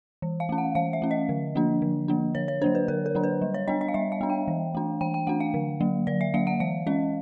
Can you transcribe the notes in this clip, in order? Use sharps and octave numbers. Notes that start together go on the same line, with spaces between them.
E3
F5
A3 C#4
F#5
E3 F5
E5
A3 C#4
D#5
D3
F3 A#3 D4
D3
F3 A#3 D4
D3 C#5
C#5
F#3 A#3 D4 C5
B4
D3 A#4
A#4
F#3 A#3 D4
B4
G3
C#5
B3 D4 D#5
D#5
F5
G3 E5
F5
B3 D4
G5
E3
A3 D4
E3 G5
G5
A3 D4 F#5
F5
D3
F#3 A#3
D3 D5
E5
F#3 A#3 F5
F#5
E3 F5
G#3 C#4 D#5